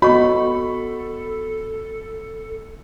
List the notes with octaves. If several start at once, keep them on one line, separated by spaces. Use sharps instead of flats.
B3 F#4 A4 C#5 D#5 B5 C#6